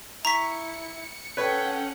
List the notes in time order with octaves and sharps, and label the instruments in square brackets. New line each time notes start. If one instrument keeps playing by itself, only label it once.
[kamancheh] E4 [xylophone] A#5 C#6 B6 [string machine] C#7
[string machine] C#4 F#5 [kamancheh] A4 G5 [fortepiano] B4 C#5 B5